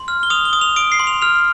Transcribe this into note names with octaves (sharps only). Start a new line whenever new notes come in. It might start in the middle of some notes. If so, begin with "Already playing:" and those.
Already playing: C6
F6
G7
D#6 F7
G7
D#6
F7
D#6 D7
C7
C6
F7
F6 F7